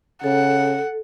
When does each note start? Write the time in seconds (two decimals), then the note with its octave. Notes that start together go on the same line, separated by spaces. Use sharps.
0.24 C#3 A4 F#5